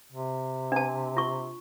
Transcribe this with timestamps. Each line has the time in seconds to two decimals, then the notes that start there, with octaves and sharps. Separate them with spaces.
0.12 C3
0.72 D4 A5
1.17 F4 C#6